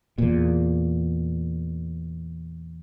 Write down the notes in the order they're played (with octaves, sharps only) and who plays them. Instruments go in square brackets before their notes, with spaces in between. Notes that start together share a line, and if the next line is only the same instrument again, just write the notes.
[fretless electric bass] E2 A#2